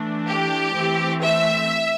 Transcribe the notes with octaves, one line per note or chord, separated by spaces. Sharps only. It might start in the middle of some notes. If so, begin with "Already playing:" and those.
Already playing: E3 A3 D4
G4
E3 A3 C4
E5